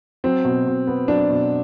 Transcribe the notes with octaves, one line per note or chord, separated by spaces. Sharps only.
F#3 C4
B2
B2
B3
F#3 D4
B2